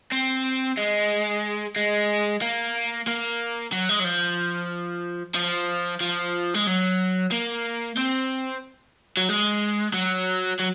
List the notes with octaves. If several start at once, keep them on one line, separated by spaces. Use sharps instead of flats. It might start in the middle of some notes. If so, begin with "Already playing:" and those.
C4
G#3
G#3
A#3
A#3
F#3
G#3
F#3
F3
F3
F3
G#3
F#3
A#3
C4
F#3
G#3
F#3
F#3